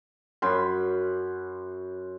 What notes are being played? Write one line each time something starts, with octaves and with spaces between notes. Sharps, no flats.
F#2 B5 C6